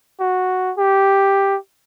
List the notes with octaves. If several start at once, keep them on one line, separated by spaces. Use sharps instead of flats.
F#4
G4